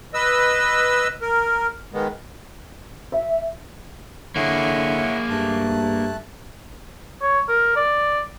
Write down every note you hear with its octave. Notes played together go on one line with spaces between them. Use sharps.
B4 D#5 E6
A#4
D#3 G#3 B3
E5
D3 A#3 E4 G#4 C#5 F#5
G2 A3 A5 F#6
C#5
A#4
D5